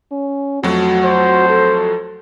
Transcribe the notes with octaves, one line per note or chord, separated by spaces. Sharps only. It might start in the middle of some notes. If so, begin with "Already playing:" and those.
C#4
F2 F#3 A3 F#4
C5
A4